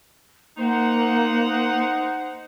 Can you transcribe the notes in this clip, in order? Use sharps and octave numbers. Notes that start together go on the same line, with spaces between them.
A#3 D#4 C5 F#5